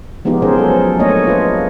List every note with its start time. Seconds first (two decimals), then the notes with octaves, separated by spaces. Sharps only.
0.25 F3 G#3 B3 D#4 F4 G4
0.42 C#4 G#4 A#4 C5
0.57 F#3 D#4 A4
0.99 A3 A#3 D4 C#5 D#5
1.27 F4 B4